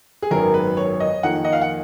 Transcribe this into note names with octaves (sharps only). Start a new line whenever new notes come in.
G#4
G#1 F#2 D#3 F#3 B3 A#4
B4
C#5
D#5
F2 D#3 A#3 F#5
D#5
F5
F#5